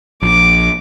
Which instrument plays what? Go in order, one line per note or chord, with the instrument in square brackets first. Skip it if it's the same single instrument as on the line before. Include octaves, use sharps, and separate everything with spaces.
[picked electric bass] A#1 [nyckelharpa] D6